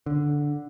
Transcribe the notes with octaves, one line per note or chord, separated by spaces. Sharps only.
D3